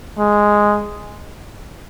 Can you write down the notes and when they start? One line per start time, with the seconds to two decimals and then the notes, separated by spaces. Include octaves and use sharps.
0.19 G#3